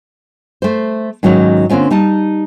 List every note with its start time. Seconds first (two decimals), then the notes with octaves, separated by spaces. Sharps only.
0.62 A3 C5
1.23 G#2 D#3 F#3 C#4 D#4
1.69 D3 A#3 C4 C#4 F4
1.91 G3 D#4 A5